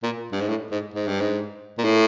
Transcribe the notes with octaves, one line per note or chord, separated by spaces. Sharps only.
A#2
G2
G#2
A2
G#2
G#2
G2
G#2
A#2
A2